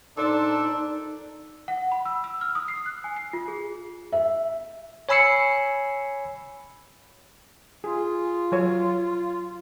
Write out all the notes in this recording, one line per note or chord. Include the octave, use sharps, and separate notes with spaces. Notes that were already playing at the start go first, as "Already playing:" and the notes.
A#2 D4 D#4 A4 C5 D5
F#5
B5
E6
E6
F6
D#6
C7
F#6
G#5
C7
F4
G#4
E5
C#5 G#5 B5 E6 C7 C#7
F4 G#4
F#3 C#5